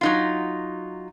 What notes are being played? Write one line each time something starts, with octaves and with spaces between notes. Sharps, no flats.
F#3 D#4 F4